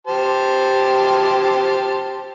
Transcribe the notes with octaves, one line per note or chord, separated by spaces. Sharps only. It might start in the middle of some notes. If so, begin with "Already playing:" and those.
G4 C5 A5